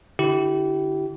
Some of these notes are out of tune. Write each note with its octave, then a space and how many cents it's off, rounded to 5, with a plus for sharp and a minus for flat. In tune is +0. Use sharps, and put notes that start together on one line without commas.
D3 +0 E4 +0 G4 -30